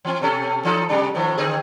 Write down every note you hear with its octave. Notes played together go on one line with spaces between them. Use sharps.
E3 C4
B2 C#4 A4
E3 D#4 A4
C3 G3 D4
A2 D#3 F3
D3 C4 G#4